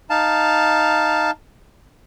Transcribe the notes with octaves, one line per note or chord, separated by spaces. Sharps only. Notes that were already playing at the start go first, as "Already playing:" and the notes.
D#4 F5 A5